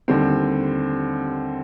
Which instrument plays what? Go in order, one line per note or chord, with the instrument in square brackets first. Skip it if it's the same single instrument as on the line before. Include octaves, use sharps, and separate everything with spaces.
[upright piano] D#2 D3 G3 C4